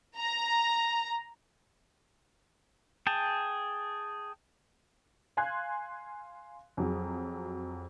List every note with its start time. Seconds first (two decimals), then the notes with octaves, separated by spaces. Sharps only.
0.16 A#5
3.07 G#4 G5 A5
5.37 F5 G#5 C6 F#6 G#6
6.77 F2 F#3 G#4